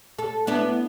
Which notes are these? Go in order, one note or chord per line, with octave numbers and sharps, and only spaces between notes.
A4
B3 D4 E4